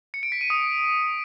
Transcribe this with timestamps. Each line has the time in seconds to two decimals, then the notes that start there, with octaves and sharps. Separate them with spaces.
0.14 C#7
0.23 D7
0.32 B6
0.41 D#7
0.50 D#6